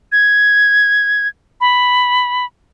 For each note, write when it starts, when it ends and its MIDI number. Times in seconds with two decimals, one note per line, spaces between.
0.12 1.28 92
1.61 2.45 83